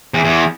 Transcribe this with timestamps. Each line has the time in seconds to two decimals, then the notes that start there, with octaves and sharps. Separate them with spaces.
0.14 E2
0.25 E2